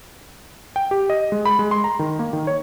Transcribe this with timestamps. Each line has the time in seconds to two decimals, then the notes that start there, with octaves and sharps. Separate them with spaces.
0.76 G5
0.91 G4
1.10 D#5
1.32 G#3
1.45 B5
1.59 G#3
1.71 C6
1.84 A#5
1.99 D#3
2.19 A#3
2.33 D#3
2.47 C#5